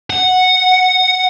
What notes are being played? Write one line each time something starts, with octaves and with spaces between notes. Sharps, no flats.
F#5